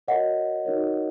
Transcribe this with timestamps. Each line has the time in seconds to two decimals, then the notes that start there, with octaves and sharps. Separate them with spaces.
0.08 F#4 A#4 C#5 D#5 F#5
0.65 D#4 F#4 A#4 C#5